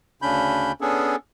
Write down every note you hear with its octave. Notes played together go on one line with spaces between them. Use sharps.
D2 C#3 C#4 D4 B5 G6
B3 C#4 D4 G#4 A4